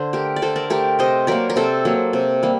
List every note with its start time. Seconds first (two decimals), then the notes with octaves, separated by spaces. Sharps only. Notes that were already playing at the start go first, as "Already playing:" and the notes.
Already playing: D3 C5
0.13 A3 G4 A#4
0.36 D5
0.42 D3 A4 C5
0.56 A#4 D5
0.70 A3 G4 A#4
0.99 C3 C5 D#5
1.27 F#3 A#3 A#4 D5
1.50 A#4
1.56 C3 A4 C5
1.85 F#3 A#3
2.13 C3
2.43 G3 A#3